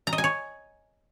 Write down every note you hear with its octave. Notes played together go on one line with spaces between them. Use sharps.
A#5
D#5
G#5
C#5